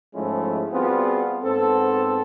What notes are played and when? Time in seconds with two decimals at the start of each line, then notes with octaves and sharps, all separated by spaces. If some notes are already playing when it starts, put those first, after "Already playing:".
0.14 G#2 F3 G#3 A3 C#4 E4
0.71 G3 B3 C4 F4 F#4 G#4
1.42 G#2 B3 C4 A4